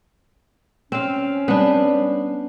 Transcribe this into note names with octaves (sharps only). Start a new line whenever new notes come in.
C4 C#4 F5
G3 B3 C4 D4